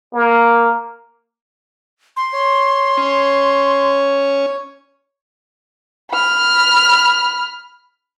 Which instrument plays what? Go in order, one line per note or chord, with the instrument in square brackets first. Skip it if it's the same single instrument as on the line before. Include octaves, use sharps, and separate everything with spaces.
[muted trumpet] A#3
[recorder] C6
[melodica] C#5
[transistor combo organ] C#4
[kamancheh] B5 F6